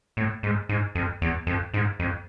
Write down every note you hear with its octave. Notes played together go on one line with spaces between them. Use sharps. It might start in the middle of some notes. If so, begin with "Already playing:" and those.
A2
G#2
G#2
F2
E2
F2
G#2
F2